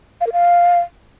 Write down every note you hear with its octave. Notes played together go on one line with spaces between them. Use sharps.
F5
A#4
F5